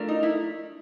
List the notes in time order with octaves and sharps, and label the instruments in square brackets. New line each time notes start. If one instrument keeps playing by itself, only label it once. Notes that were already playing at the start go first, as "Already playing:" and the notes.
Already playing: [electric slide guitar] A3 D4 F4 A#4
[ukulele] D#4
E4